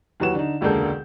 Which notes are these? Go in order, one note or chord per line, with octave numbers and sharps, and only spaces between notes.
D#2 E3 F#3 F#4 B4 E7
D3 D#4
E1 C#2 D3 A#3 A4 G6